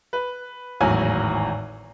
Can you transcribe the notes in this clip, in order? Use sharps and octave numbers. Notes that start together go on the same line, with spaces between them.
B4
G#1 E2 A2 F#3 G#5